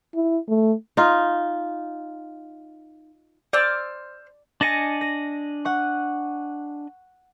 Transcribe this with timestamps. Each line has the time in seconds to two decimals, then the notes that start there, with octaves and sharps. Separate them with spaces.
0.15 E4
0.49 A3
0.97 D#4 F4
3.53 C5 D5 E6 F6
4.61 D4 D#5 G#5 A6 A#6 C#7
5.01 A#6
5.65 F#5 C#6